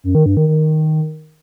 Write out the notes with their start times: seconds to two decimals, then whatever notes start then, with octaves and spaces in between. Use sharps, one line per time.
0.04 F#2
0.15 D#3
0.26 G2
0.37 D#3
0.48 D#3